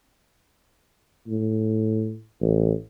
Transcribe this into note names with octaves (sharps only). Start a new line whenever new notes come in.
A2
A1